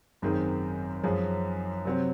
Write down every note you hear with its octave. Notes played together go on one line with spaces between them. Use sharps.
G#1 F#2 D#3 G#3 C4
F#2 F3 G#3 C#4
C3 F#3 C4